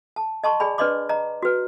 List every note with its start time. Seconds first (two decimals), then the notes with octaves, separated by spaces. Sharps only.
0.16 A5
0.44 D#5 A5 C6 C#6
0.60 G#4 D5 G#5 B5
0.78 D4 B4 D5 D#5 C6 D6
1.09 D#5 A#5
1.43 F#4 B4